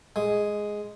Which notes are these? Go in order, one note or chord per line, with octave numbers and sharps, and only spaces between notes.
G#3